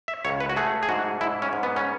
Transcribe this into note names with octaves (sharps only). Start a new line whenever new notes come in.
E5
C#2 C#5
B4
F#4
A3 G#4
G#4
G#2 F#4
G#2 E4
C#4
G#2
B3
C#4